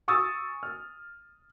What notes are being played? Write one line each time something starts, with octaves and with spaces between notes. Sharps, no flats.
G#5 C#6 D#6 E6 A6
F6